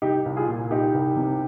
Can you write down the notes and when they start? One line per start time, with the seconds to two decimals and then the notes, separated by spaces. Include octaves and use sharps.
0.02 C2 D#4 G4
0.26 C2
0.36 F4 G#4
0.48 A#2
0.71 C2 D#4 G4
0.94 C2
1.17 C3